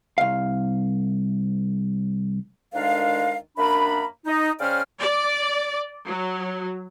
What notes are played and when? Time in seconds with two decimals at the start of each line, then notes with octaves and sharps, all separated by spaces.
0.18 C2 F5
2.74 D2 D#3 G#3 D4 A#4 F5
3.57 F#2 A#3 D4 B5
4.26 D#4
4.60 C#3 C#4 C5 D5 G5 F6
5.00 D5
6.07 F#3